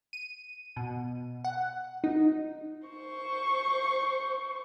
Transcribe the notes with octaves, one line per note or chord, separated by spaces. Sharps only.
D#7
B2
F#5
D#4
C5 C#6